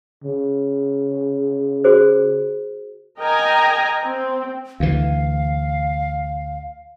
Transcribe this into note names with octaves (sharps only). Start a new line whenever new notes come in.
C#3
F#4 G#4 C5
A#4 D#5 G5 G#5 A#5
C4
D2 E3 F5